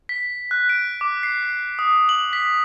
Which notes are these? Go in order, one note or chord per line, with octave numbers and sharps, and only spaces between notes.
B6
F#6
D7
D6
C7
C7
D#6
F#7
B6